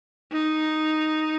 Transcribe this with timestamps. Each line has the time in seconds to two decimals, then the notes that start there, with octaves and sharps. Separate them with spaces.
0.32 D#4